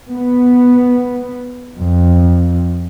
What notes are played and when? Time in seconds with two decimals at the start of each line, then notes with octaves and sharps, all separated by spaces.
0.13 B3
1.78 F2